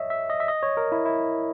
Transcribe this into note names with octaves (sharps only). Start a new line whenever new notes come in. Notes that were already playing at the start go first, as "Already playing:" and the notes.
Already playing: C#5 D#5 E5
E5
D#5
E5
D#5
C#5
A#4
E4
E4